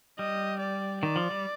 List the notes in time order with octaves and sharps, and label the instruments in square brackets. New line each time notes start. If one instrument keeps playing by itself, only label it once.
[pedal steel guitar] G3 [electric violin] D#5
[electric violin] D5
[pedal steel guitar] D#3 [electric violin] D5
[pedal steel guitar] F3
G3